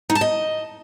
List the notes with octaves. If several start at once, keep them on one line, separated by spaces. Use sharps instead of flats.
D#4
A5
D#5